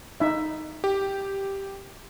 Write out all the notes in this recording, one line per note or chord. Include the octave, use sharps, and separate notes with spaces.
D#4 E5
G4